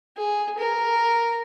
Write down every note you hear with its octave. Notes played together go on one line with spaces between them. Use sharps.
G#4
A#4